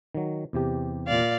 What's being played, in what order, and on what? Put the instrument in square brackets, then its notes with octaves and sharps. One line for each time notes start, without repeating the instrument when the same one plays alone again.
[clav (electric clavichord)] D#3 F#3
E2 C3 G4
[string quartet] A#2 D5 F5